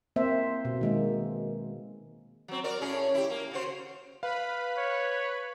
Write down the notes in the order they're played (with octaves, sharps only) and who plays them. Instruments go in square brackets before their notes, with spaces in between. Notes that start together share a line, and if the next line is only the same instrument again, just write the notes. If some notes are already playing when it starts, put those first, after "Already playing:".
[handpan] A#3 C4 C5 E5
B2
D#3 G#3 A#3
[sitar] F#3 C4
F#4 A#4 D5
A2 C#4 G#4
E4 G4
A#3
C#3 F#4 C5
[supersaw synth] B4 B5 [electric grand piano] F5
[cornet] C#5